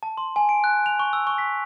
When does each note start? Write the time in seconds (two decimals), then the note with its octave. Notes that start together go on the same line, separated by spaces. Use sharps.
0.03 A5
0.18 C6
0.36 G#5
0.49 D7
0.64 F#6
0.86 F7
0.99 C#6
1.13 E6
1.27 C#6
1.38 B6